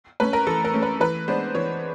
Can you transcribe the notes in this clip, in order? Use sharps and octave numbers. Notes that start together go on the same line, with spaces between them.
A3 C#4 B4
A#4
E3 A4
A#4
A3 C#4
B4
E3 B4
G#3 B3 D4 C5
E3 C#5